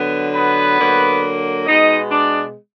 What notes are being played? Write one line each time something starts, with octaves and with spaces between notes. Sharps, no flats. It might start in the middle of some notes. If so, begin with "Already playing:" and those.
Already playing: D3 F#3 B3
B3 B4
D3 F#3 A#3
B2 G#3 B3 D#4 D#5
D4 D5